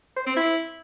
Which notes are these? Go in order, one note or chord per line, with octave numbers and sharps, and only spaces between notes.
C5
C4
E4